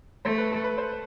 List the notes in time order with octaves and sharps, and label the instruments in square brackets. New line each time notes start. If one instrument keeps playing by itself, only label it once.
[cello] A3 [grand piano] C5
[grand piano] A4
B4
A4
B4
C5